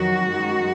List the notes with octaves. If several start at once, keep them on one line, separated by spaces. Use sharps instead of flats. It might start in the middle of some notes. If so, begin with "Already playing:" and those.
Already playing: F2 D#3 F#3 F#4
F#2 D#3 G#3